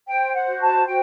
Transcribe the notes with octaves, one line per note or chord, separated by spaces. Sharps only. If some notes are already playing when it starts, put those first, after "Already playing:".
C5 G5
F#5
F#4
A5
F#4 G5